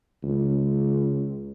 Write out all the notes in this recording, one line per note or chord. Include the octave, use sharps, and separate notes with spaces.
C#2